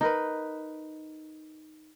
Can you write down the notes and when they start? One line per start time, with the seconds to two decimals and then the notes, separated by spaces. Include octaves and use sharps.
0.01 D#4 A#4 B4